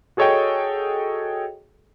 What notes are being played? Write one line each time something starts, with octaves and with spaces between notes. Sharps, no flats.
F#4 G#4 A4 C#5 D#5 G5